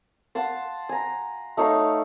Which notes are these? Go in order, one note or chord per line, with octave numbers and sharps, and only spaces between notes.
F5 F#5 A5 C6
G#5 A#5
A3 D#4 C#5 F5